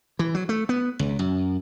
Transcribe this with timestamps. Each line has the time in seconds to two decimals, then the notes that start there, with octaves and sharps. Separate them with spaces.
0.19 E3
0.35 F#3
0.49 A3
0.69 B3
0.99 C#2
1.19 F#2